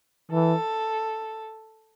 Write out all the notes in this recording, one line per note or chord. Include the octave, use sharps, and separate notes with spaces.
E3 A4